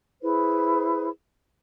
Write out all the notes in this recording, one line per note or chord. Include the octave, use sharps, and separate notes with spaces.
E4 G#4 B4 C5